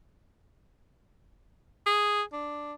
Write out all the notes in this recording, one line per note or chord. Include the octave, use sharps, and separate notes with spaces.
G#4
D4